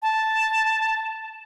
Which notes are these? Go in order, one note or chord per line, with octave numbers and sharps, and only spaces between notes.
A5